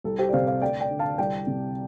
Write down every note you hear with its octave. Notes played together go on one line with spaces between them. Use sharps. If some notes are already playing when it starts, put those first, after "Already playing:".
C2 A4
G4 C5
D5
C3 C5 F5
C5 F5
D2 D5 G5
D5 G5
D3
F5 A5
C2 D5 G5
C3